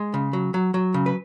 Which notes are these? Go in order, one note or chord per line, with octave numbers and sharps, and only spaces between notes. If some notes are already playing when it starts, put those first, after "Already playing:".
Already playing: G#3
C#3
F#3
F#3
F#3
C#3
B4